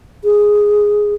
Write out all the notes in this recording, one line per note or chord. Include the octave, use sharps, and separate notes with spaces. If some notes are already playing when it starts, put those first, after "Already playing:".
G#4